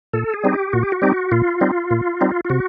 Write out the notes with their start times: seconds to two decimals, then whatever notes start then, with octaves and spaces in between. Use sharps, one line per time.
0.13 A#2 A4
0.34 G#4
0.44 G3 C4 D#4
0.53 G4
0.73 A#2 F#4
0.83 G4
0.92 F#4
1.02 G3 C4 D#4 G4
1.12 F#4
1.32 A#2 F4
1.61 G3 C4 D#4
1.91 A#2
2.21 G3 C4 D#4
2.45 F4
2.50 C3 F#4